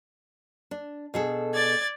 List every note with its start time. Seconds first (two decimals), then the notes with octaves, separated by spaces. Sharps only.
0.71 D4
1.14 B2 G#4 A4
1.54 D5 G#6 A6